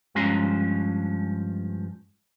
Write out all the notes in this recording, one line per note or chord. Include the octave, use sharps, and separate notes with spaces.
G2 F3 G#3 C#4 A#5 C6